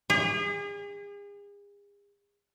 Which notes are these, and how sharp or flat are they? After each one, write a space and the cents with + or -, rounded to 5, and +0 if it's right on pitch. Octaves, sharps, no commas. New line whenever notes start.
G#4 -40